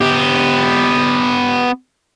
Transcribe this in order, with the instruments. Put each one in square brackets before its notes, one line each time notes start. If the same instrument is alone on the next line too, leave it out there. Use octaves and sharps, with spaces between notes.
[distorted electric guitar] B3 G4